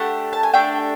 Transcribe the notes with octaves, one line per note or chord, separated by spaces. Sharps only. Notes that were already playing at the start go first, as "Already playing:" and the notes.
Already playing: A3 D4 G4 F#5
A5
G#5
A3 D4 G4 G5